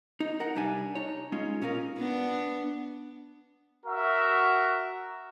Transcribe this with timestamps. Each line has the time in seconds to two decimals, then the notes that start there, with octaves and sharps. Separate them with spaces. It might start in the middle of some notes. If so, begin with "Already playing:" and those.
0.20 D#4
0.40 D#4 A#4 F#5
0.55 C2 G3 D4 E5 G#5
0.95 D#4 C#5
1.32 G#3 C#4 F4
1.62 A#2 C#4 D#4 F4 A#4
1.98 B3 D4
3.85 F#4 A#4 E5